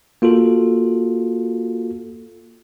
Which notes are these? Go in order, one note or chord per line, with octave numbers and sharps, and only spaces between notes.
A#3 F4 F#4 A4